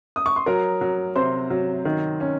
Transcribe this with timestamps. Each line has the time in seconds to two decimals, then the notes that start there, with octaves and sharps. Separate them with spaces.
0.16 D#6
0.26 C#6
0.36 C6
0.46 F#3 A#4 A#5
0.81 F#3
1.16 C3 C5 C6
1.50 F#3
1.85 D#3
2.20 C#4